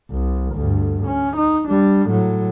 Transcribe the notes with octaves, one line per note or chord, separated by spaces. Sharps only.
C2
D2 G2
C#4
D#4
G3 D4
A2 F#3